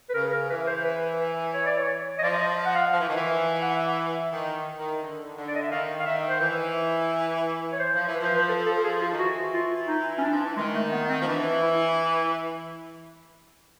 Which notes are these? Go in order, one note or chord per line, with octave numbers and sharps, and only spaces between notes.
B4
C#3 A#4
A#4
E3 B4
C5
B4
C#5
D5
C#5
D#5
F3 D5
D#5
F#5
F5
F3
E3
D#3
E3
F#5
D#3
D#3
D3
D3
D5
D#5
E5
D#3 F5
F5
D#3 E5
C5
E3 B4
C#5
C5
F3
E3
B4
F3 C5
B4
A4
A4
A4
G#4
F4
D#3
E3 F#4
F4
D#4
C#4
D4
F3
E3
D#3 G#3
A3
B3
C4
F3
E3 D4
E4